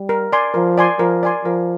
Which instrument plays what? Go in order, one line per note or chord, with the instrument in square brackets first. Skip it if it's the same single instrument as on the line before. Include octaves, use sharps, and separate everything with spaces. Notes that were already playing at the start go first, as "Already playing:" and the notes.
Already playing: [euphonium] G3
[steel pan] A#4
D5 G#5 C6
[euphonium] F3 [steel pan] A#4
[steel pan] D5 G#5 C6
[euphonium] F3 [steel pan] A#4
[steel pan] D5 G#5 C6
[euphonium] F3 [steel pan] A#4